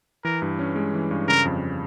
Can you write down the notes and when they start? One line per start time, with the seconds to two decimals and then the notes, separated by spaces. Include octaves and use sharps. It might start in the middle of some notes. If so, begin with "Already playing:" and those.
0.24 E3 A#4
0.42 G2
0.59 C#4
0.76 G#3
0.94 E3
1.11 G2
1.28 C#3 A#4
1.45 F2